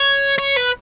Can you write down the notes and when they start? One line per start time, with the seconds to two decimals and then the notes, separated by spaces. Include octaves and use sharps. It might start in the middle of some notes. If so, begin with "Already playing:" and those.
Already playing: C#5
0.39 C#5
0.57 B4